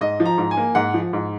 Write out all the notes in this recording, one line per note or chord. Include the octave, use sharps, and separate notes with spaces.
G#2 D#5
F3
A#5
G#2
G#5
A#3
G#2 F#5
F3
G#2